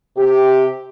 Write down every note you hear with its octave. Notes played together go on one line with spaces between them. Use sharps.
C3 G4